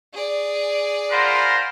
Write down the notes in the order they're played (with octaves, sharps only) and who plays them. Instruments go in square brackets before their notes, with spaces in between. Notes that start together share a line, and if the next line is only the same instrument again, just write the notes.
[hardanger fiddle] G#4 D5
[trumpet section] F4 A#4 C5 [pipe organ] F#5 B5 C6